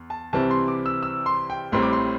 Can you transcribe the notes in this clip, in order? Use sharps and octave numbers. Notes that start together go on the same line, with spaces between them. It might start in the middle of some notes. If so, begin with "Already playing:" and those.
Already playing: E2
A5
C2 C3 E3 C4 A5
C6
D6
E6
E6
C6
G5
A1 A2 G3 C4 C6
D6
C6